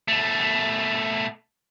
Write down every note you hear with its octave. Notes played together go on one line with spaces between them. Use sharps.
B2 A3